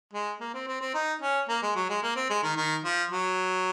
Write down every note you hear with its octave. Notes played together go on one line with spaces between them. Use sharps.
G#3
A#3
C4
C4
C4
D#4
C#4
A#3
G#3
F#3
G#3
A#3
C4
G#3
D#3
D#3
F3
F#3